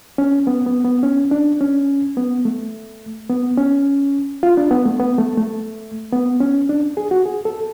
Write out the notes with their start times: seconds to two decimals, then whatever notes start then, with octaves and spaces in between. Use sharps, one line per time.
0.18 C#4
0.47 B3
0.66 B3
0.84 B3
1.03 C#4
1.31 D4
1.61 C#4
2.17 B3
2.45 A3
3.30 B3
3.58 C#4
4.43 F4
4.57 D4
4.71 B3
4.86 A3
5.00 B3
5.18 A3
5.37 A3
6.13 B3
6.40 C#4
6.69 D4
6.97 G#4
7.11 F#4
7.26 G#4
7.45 A4